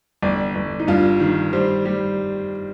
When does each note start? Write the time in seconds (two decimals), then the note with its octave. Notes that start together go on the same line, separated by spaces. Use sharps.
0.22 G1 D5
0.55 G1
0.80 D#4
0.88 G2 F4
1.20 D#3
1.53 G3 C5
1.85 G3